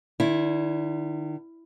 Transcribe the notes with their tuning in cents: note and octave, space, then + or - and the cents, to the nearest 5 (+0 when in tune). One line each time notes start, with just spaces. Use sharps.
D#3 -35 E4 +5 D5 -10